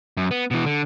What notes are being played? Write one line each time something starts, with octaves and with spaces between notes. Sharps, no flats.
F#2
B3
B2 E3
D3